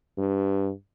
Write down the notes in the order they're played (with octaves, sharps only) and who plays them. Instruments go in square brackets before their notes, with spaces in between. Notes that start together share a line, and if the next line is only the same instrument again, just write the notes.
[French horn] G2